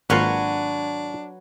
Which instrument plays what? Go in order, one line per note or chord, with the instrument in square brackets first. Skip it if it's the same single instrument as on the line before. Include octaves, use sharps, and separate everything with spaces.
[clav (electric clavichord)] G#1 A#3 F4 [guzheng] F#3 B4 C#5 [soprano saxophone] D4